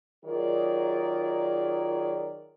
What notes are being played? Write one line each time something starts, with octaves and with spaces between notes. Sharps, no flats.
D#3 F#3 F4 G#4 A#4 D5